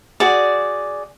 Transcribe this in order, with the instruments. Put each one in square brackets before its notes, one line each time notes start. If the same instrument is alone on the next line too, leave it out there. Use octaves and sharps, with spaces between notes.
[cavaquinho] F#4 G#4 D5